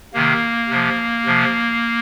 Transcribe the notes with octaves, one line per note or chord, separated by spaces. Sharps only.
C3 D#3 A#3
C3 F3
C3 F3